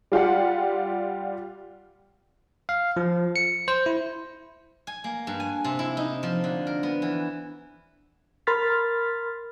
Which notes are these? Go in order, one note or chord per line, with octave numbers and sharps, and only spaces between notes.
G3 F4 G4 F#5
F5
F3
C#7
C5
E4
G#5
A#3
G2
G#5
C3
E4
D#4
F3
D3
A#4
B3
E3
A#4 B5 C6 F6 A6 B6